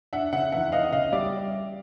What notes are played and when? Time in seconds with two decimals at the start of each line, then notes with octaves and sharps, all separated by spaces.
0.13 D4 E5 F#5
0.33 C#3 E5 F#5
0.52 E2 E5 F#5
0.72 E3 D#5 F5
0.92 C#3 D#5 F5
1.12 G3 D5 E5